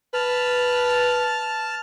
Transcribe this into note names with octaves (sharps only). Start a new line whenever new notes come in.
B4 A5 F6